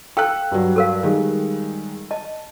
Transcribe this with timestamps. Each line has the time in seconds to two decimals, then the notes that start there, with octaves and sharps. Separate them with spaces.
0.17 A4 F5 G5 E6 F#6
0.52 G2 F#3
0.76 A4 A#4 F5
1.03 D#3 G3 G#3
2.11 D#5 A5